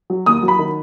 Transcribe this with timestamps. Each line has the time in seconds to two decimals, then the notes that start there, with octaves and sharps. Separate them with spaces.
0.10 F#3
0.26 D#2 D#6
0.43 F#3
0.48 B5
0.59 D#3